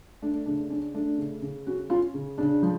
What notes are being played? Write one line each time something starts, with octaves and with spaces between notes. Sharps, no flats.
A3 D4
C#3 D4
C#4 D4
A3 D4
C#3
C#3
C#4 F#4
C#4 F4
C#3
C#3 D4
F3